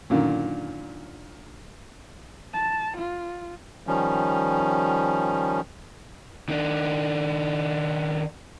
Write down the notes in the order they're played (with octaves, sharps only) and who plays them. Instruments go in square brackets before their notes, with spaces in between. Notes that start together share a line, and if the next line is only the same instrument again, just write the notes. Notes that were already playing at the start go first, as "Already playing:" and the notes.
[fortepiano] F#2 A#2 D3 D#3
[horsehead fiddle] A5
F4
[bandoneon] D#3 F3 G3 C#4
[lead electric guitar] D#3 D4